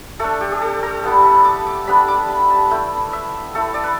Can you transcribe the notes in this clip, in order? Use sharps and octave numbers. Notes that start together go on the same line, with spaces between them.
A3 D4 A4
G4
G4
A4
A4
G3 B3 E4 A4
B5
D6
D6
G3 B3 D4 B5
D6
B5
A5
A3 E4 G5
E5
A3 E4 A4
D5
B4